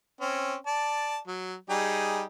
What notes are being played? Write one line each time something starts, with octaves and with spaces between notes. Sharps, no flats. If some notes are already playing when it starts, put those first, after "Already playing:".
C4 C#4
D5 A5
F#3
G3 D#4 G#4